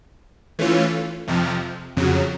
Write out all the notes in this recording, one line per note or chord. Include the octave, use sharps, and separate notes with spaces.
E3 A3 C#4 F4
F2 C3 F3
F2 C#3 F#3